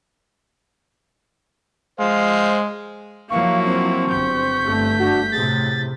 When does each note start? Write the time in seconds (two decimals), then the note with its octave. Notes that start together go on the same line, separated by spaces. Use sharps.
2.00 G#3 C5 F5
3.30 F3 F#3 A#3 E4 F5 C#6
3.65 C4
4.11 G1 G6 B6
4.61 G1 A3
4.99 D4 F#4
5.32 A2 C3 G#4 A6